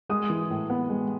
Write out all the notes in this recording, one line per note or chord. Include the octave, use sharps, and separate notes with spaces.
G#3 D#6
E3
A2
B3
G#3